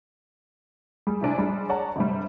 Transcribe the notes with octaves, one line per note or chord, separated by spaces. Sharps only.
G3 G#4
A2 C3 D4 G#5
F3 G3 G#3 D4
G#4 C#5 D5 F#5 A5 A#5
G1 C3 G3